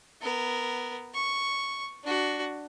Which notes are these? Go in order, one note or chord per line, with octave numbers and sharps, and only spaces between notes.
B3 A#4
C#6
D4 F#4